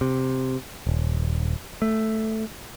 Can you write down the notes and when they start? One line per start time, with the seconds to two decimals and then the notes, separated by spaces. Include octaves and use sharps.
0.01 C3
0.87 D#1
1.82 A3